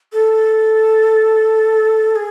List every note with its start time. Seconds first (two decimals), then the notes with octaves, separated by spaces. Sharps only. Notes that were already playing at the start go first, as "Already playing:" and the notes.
0.13 A4
2.16 G#4